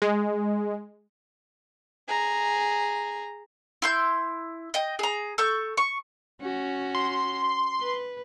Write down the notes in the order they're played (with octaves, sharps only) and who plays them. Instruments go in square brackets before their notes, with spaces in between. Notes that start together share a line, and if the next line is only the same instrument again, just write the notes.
[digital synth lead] G#3
[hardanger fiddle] G#4 A#5
[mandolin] E4 C6 G6
D#5 G5
G#4 A#5
A4 C#6 G6
C#6
[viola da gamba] C#4 F#4
[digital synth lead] C6
[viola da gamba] B4